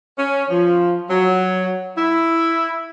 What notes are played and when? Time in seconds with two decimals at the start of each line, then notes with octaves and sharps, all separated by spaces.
0.18 C#4
0.51 F3
1.10 F#3
1.98 E4